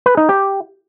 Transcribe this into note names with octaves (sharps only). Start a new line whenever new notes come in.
B4
D#4
G4